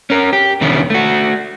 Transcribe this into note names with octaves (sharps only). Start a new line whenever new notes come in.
C#4 A#4
G4
E2 B2 D3 D#3 C#4 E4
A3 F#4